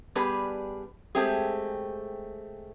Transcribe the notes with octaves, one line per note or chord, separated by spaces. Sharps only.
G3 B3 D4 G4 G#4 B4
G#3 A3 C4 G4 G#4